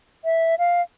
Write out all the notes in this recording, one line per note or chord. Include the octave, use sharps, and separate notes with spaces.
E5
F5